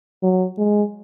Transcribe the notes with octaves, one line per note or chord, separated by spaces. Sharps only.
F#3
G#3